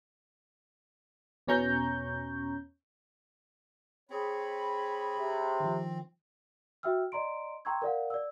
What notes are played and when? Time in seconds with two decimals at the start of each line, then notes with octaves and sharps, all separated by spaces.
1.47 E2 B2 C#4 A#5 C#6 G6
4.10 C4 G#4 C#5 B5
5.18 C3
5.60 D#3 F3
6.83 F#4 E5 G5 E6 F6
7.12 D5 D#5 A#5 C6 D7
7.65 G5 A#5 C6 C#6 E6 G#6
7.82 A#4 D5 F5 F#5
8.10 D5 E6